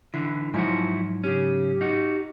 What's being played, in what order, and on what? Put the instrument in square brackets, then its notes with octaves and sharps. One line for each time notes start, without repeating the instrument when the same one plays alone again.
[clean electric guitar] D3 E3 [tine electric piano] E4
[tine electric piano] G#2 F#3 [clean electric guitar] F3 E4 F#4
[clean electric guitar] C#3 C#4 [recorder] G4
[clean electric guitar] D#4 F#4